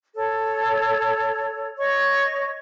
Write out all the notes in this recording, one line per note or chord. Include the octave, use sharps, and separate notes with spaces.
A4 C#5
C#5 D#5 C#6